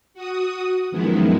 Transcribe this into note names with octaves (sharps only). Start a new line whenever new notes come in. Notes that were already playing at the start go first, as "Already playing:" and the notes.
F#4 D#6
F#2 D#3 F3 G#3 B3 E4